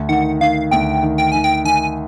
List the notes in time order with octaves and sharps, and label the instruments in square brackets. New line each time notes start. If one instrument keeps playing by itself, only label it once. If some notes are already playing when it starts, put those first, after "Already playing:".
Already playing: [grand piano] D2
[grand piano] D#3 [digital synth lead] F#5
[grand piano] D#3 [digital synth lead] F5
[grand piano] D2 [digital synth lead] G5
[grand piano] D#3
[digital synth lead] G5
[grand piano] D#3 [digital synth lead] G#5
[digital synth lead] G5
[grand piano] D#3 [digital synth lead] G#5